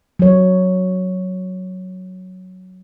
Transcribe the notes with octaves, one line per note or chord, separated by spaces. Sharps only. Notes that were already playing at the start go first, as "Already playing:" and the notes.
F#3 C#5